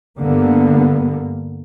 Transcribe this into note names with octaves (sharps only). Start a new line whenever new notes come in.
G2 D3 A#3 B3